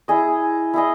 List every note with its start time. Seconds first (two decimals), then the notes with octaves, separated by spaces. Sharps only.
0.08 E4 G#4 D#5
0.74 E4 G#4 D#5